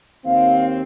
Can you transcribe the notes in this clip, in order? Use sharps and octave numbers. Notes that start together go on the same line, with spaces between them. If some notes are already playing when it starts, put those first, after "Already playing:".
D#2 C4 F5